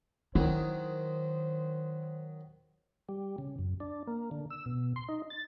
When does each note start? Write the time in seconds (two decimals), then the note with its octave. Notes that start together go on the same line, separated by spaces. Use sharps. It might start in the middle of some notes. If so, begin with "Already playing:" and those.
0.35 D#3 F#3 E4 C5
3.09 G3
3.38 C#3
3.59 F#2
3.80 D4
4.07 A#3
4.31 D3
4.50 E6
4.66 B2
4.96 C6
5.09 D#4
5.30 A6